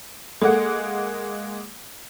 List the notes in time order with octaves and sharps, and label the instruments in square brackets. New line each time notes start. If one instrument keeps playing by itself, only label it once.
[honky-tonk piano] G#3 A#3 F#5 [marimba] A4